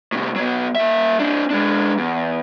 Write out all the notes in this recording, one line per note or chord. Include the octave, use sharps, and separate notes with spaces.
A2 C3
F#3 B3
A#3 E5
C4 D4
G#3 D4
E2